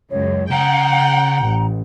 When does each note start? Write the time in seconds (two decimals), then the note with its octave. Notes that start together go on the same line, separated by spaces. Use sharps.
0.11 C#2 F#2 C#5
0.51 C#3 F#5 G5 A#5
1.39 A1